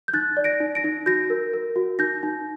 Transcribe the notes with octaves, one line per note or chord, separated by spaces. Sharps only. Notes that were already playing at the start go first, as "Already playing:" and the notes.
G6
D#4 F#6 A6
D5
A#6 D7
D#4
A#6 D7
D#4
F#4 G6 A#6
A#4
A#4
F#4
D#4 G6 A#6
D#4